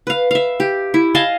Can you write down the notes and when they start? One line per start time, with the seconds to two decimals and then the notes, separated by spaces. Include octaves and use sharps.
0.07 B4 F5
0.31 E5 F5
0.60 G4
0.94 E4
1.15 D#5 F5 G#5 A5